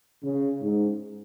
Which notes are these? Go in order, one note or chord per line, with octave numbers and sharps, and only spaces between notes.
C#3
G#2